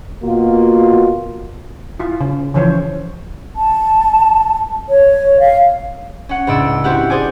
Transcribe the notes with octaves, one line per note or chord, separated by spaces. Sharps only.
B2 A#3 F4 F#4
E4 F4
C#3
C#3 E3 F3 C5 C#5
A5
C#5
F5
C#4 F#5
C#2 A2 D4 E6 D7
C4 E4 F#4 G4 F#5
G#4 C5 D5 G#5 D6